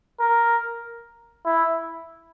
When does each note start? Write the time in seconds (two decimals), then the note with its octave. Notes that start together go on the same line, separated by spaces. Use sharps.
0.20 A#4
1.46 E4